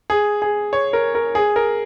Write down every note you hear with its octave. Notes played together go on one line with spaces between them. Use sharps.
G#4
G#4
C#5
A#4
A#4
G#4
A#4